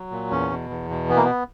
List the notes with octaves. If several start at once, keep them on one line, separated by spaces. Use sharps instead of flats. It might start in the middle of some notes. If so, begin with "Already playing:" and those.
Already playing: F#3
A#2
E2 C#4
B2
E2
B2
E3 B3
A#3
B3